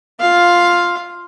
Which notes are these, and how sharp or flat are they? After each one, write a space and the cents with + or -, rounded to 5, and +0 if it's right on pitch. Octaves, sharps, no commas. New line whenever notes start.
F4 +0 F5 +5